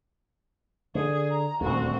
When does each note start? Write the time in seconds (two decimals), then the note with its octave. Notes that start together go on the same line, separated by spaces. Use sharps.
0.95 D3 G#4
1.31 A#5
1.61 D#1 D2 C4 F#4